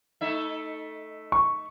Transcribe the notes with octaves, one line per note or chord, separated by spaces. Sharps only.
A3 D#4 E5
C#6